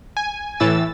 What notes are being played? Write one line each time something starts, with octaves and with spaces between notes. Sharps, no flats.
G#5
A2 E3 E6 A6